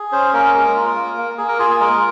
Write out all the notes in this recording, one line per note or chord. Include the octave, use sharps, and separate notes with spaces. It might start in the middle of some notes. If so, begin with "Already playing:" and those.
Already playing: G#4
C#4 C5
A#3 A#4
G#3 A#4
F4
A#3
A#3
A#3 G#4
A#4
F4 G#4
G#4
G#3 A#4